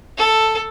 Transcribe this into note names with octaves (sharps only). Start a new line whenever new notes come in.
A4